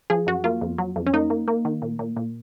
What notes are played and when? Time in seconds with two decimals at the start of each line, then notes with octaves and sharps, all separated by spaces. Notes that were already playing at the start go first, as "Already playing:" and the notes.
0.10 F3 G#4
0.27 F#2 F#4
0.44 A#3 F4
0.61 F2
0.78 F#3
0.96 F2
1.07 C#4
1.13 A#3 D#4
1.30 A#3
1.48 A#3
1.65 D#3
1.82 A#2
1.99 A#2
2.17 A#2